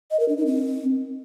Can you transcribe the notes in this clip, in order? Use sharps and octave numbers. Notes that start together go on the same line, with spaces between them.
D#5
A#4
D4
D#4
C4